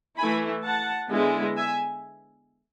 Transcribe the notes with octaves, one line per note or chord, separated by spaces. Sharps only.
E3 A3 E4 G#5 B5
F#5 A5
D3 G#3 B3 E4
E5 G#5